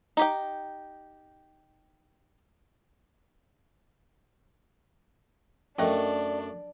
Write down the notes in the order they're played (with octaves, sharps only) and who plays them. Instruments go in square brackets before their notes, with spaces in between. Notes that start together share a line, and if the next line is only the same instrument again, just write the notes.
[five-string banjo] D#4 G4 G5
[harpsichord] F#2 A3 [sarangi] D4 [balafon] A#4 D#5 G5